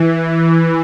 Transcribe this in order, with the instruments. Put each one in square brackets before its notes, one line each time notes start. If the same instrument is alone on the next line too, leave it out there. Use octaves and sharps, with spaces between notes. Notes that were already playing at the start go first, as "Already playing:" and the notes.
Already playing: [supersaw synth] E3